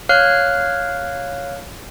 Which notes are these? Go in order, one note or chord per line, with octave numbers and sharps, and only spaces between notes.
C#5 F5 F6 F#6